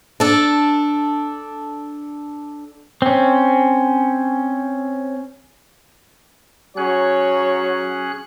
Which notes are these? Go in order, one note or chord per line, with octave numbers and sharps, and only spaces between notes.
D4 A4
C4 C#4
F#3 C#4 G#4 C#5 F#6